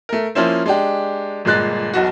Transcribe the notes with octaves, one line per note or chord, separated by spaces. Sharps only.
A3 A#4
F3 A#3 C#4 E4 C5
G#3 D4 G4
G1 A#2 G#3 F#6 A6
E1 B1 F#4